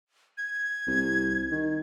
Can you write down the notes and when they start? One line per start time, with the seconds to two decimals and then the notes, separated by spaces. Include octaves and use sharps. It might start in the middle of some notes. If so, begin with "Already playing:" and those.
0.38 G#6
0.87 C2
1.51 D#3